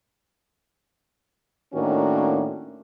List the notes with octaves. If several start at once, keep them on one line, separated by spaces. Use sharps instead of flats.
A2 D#3 A#3 C#4 D4 F#4